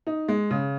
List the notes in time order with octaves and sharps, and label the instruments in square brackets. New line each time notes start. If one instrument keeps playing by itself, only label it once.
[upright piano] D#4
G#3
C#3